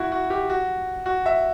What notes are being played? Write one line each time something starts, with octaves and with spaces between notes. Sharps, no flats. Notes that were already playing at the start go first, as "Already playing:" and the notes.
Already playing: E4 F#4
F#4
G4
F#4
F#4
E5